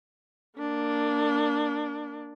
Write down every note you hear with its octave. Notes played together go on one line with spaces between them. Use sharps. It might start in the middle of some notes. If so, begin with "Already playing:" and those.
A#3 D4